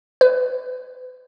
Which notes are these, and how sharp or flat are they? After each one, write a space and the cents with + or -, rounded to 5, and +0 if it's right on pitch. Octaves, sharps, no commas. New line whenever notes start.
B4 +40